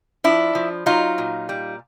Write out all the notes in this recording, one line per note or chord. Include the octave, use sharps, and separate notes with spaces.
F3 D4 E4
F3
F#3 D#4 F4
A#2
G3